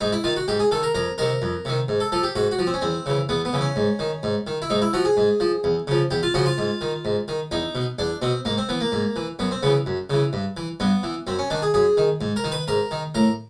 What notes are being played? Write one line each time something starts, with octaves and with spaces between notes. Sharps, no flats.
G#2 D#4
E4
D#3 F4
F#4
G#2 G4
G#4
D#3 A4
A#4
F2 A#4
C3 D#3 A#4
F2
C3 D#3
G#2
A4
F3 A4
G4
G#2 F#4
F#4
F3
C4
C#4
E2 C4
C#3 E3
E2 B3
B3
C#3 E3
C#4
G#2
D#3
G#2
D#3
E4
G#2 D#4
E4
F3 F#4
G#4
G#2
F3
E2
C#3 F3
E2 G4
F4
C#3 F3 F#4
F4
G#2
D#3
G#2
D#3
E2 D#4
B2
E2 D4
B2 C4
G#2 A#3
C4
E3 B3
A#3
G#2
E3
F#2 B3
C4
C#3 E3 B3
F#2
C#3 E3
G2
E3
G2 B3
E3
F#2 C4
C#4
D#3 D4
G#4
F#2 G#4
D#3
G#2
A#4
D#3
B4
G#2 A#4
D#3
A2 A#4